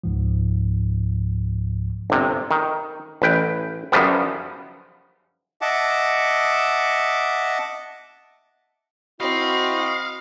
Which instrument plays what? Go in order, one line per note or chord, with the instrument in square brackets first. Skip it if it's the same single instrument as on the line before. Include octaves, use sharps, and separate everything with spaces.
[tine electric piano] C#2 G#2 F3
[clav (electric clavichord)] G1 C3
D#3
A1 B4 G5
F#2 C#3 F3 G3 B3
[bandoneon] D#5 E5 F#5 A5 D6
[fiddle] C4 [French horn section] E4 F#4 [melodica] D#5 B5 C#6 [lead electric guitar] F5